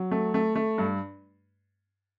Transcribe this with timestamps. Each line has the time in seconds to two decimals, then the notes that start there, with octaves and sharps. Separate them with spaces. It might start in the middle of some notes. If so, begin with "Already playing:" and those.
Already playing: F#3
0.11 A3
0.34 A3
0.56 A3
0.78 G2